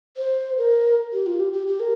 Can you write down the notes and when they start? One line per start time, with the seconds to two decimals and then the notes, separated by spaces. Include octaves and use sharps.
0.17 C5
0.58 A#4
1.13 G4
1.26 F4
1.40 G4
1.53 G4
1.67 G4
1.80 A#4